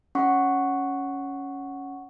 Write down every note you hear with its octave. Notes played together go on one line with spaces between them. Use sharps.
C#4 F#5 C#6